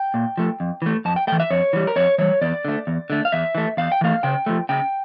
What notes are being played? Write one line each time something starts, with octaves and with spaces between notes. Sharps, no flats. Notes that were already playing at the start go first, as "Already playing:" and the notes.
Already playing: G5
A#2
F3 A3
F2
E3 A3
F2 A5
G5
E3 A3 G5
E5
F2 C#5
E3 G3
A#4
F2 C#5
E3 G3 C#5
E2 D5
D3 A3
E2
D3 A3
F5
E2 E5
E3 A3
E2 F5
G5
E3 A3 F5
C#3 G5
F3 A3
C#3 G5